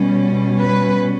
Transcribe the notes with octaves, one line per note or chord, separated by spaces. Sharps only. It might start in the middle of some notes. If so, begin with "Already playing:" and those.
Already playing: B2 G3 C#4
B4